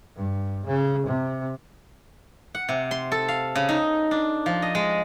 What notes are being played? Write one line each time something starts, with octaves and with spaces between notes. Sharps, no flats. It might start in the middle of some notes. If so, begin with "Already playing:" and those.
G2
C#3
C3
F#5
C3
C6
A4
F5
C#3
D#4
D4
F3
D#5
G#3